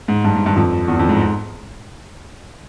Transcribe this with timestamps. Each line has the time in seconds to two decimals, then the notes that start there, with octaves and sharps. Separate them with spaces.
0.08 G#2
0.24 G2
0.36 G#2
0.46 G2
0.56 F2
0.88 E2
0.99 F2
1.09 G#2